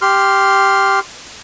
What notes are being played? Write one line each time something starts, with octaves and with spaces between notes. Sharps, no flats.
G4 C6 F6